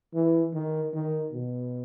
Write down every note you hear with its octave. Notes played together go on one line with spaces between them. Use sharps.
E3
D#3
D#3
B2